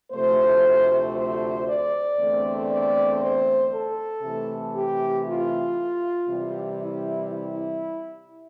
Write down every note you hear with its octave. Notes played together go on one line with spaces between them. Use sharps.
D2 C3 F3 A3 C5
C5
D5
E2 D3 A3 C4
D5
C5
A4
C3 E3 A3
G4
F4
C3 E3 G3
E4
E4